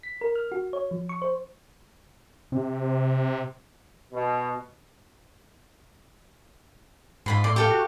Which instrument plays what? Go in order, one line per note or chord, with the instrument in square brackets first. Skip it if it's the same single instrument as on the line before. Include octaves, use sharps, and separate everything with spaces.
[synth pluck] B6
A#4
F6
F#4
C#5
F3
C#6
C5
[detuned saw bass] C3
[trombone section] B2
[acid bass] G#2 [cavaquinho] F4 B5 C6
[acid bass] A2 [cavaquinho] D5 C6
[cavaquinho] G4 A4 F5
[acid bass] F#4